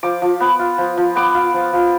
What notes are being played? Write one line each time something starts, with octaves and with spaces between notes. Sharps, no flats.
F3 D6
F3
B3
F4
F3
F3
B3 D6
F4
F3
F3